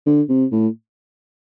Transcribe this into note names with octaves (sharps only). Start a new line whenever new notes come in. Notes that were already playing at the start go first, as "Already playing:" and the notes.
D3
C3
A2